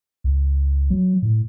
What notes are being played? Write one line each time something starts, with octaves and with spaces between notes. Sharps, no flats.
C#2
F#3
A2